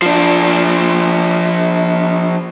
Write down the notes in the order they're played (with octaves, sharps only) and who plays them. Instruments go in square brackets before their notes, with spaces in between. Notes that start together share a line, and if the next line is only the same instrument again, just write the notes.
[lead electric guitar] F3 D4